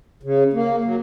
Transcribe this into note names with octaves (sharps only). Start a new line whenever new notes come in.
C#3
A#3
F#3